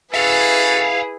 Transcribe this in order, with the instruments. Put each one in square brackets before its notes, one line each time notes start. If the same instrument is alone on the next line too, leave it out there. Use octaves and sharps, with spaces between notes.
[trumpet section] C#4 F#4 A4 [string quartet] E4 G#4 B4 [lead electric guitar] E5 F5